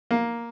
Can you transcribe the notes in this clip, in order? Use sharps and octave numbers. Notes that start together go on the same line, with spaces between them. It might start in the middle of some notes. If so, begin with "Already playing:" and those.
A#3